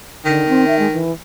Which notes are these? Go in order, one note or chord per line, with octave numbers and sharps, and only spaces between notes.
D3 D#3
C4
E5
G#3
E3